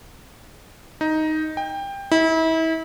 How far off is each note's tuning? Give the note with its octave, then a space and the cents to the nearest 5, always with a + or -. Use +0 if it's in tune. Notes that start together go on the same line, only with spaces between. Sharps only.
D#4 +5
G5 +20
E4 -35